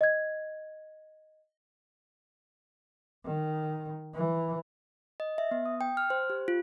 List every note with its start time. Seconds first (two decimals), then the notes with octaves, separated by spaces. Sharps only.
0.01 D#5 G#6
3.25 D#3
4.14 E3
5.20 D#5
5.38 E5
5.51 B3
5.65 D#6
5.81 G5
5.97 F6
6.10 C5
6.30 G4
6.48 F4